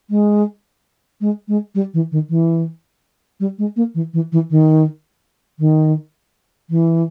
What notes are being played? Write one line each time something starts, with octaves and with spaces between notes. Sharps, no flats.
G#3
G#3
G#3
G3
E3
D#3
E3
G3
G#3
A#3
E3
E3
E3
D#3
D#3
E3